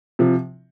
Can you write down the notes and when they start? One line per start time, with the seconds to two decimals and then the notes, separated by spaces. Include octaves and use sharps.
0.19 C3 F3